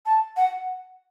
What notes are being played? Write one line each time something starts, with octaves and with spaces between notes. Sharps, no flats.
A5
F#5